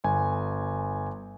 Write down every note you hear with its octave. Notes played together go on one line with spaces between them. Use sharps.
G1 G#5